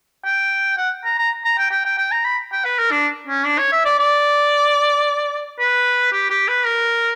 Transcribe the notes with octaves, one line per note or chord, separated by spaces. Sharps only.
G5
F#5
A#5
A#5
A#5
G5
G5
G5
G5
A#5
B5
G5
B4
A#4
D4
C#4
D4
C#5
E5
D5
D5
B4
G4
G4
B4
A#4